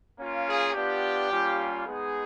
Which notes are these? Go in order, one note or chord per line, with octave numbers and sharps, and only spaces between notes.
A#3 C#4 F4
G#4
B3 D4 F4 G4
G3 A#3 C#4 F4
G#3 B3 D#4 G#4